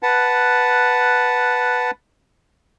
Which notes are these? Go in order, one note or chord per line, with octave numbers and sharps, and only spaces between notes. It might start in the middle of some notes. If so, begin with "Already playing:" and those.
B4 F#5 A5